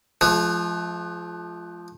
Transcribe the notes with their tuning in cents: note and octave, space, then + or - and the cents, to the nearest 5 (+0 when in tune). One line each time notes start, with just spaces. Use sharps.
F3 -5 G#3 +45